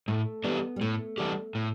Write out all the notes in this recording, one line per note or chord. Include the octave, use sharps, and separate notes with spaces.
A2 A3
E3 G3 B3 D4 G4
G3
A2 A3
E3 G3 D4 G4
A2